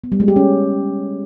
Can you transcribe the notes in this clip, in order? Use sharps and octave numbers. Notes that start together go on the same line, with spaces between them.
B3
G3
G#3
G4
C#4